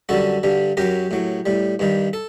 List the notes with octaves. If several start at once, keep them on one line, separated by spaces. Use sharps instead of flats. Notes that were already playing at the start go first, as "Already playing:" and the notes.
F#2 D3 G3 F#4 A4
G2 D3 G3
F#2 F#3 G4 A#4
A2 F#3
A2 G3
G2 D#3 G3
A4